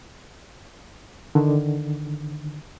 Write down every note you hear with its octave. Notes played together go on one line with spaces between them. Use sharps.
D3 D#3